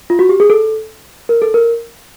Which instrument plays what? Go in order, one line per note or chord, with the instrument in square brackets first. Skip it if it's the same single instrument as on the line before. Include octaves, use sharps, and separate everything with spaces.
[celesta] F4
F#4
G4
G#4
A4
A#4
A4
A#4